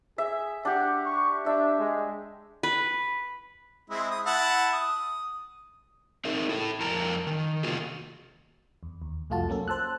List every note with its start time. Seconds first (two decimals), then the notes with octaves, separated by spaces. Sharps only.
0.18 G#4 E5
0.65 D4 G4 F#5
1.05 C#6
1.46 D4 E5
1.79 G#3
2.63 B4
3.90 G#3 C4 E4
4.11 D#6
4.26 E4 F#5 A5
4.73 D#6
6.25 C4 D#4 G#4 A#4 E5
6.49 E4 A4
6.80 F2 A#4 G5 A5 A#5
7.27 D#3
7.63 C3 A#3 F4 F#4 G#4
8.83 E2
9.02 D#2
9.30 C2 F2 A3 F4 F#4 A5
9.49 F#3 A#3 C#4 A4
9.68 C5 A5 E6 F#6